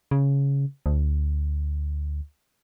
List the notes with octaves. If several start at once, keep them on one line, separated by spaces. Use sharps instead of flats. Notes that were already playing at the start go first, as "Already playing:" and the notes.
C#3
D2